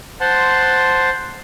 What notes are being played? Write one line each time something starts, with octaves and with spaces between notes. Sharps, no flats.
C5 F#5 A5 C6